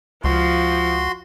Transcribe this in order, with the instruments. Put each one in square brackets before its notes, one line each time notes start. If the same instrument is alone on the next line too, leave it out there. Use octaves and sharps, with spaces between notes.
[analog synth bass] C#2 [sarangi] F3 [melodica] F#4 C6